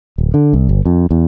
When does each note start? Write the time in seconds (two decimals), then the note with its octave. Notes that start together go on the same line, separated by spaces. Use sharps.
0.18 D1
0.34 D3
0.53 C2
0.69 G1
0.86 F2
1.11 E2